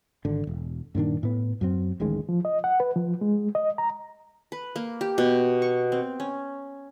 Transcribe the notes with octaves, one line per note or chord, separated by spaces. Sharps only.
G#1 D3
E1
G2 A#2 D#3 D4
A2 B3
F#2 F#3 C4
D1 A1 D#3 G#3
F3
D#5
F#5
B4
F3
G#3
D#5
A#5
B4
A#3
G4
B2
C#6
C4
C#4